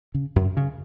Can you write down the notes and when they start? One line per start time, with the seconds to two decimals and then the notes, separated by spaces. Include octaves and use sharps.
0.14 C#3
0.36 F#2
0.57 C#3